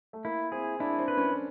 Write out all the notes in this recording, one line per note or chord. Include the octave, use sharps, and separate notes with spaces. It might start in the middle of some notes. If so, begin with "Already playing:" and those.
A3
A#3 E4
C4 G#4
D4 E4
C4
B4
C#4